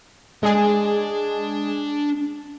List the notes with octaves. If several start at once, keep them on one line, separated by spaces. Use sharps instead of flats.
G#3 D4 G#4